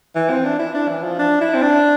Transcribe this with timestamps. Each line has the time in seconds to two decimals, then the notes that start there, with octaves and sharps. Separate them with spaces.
0.16 E3
0.30 C4
0.45 D4
0.59 E4
0.74 D4
0.89 E3
1.03 F3
1.19 D4
1.41 E4
1.54 C4
1.62 D4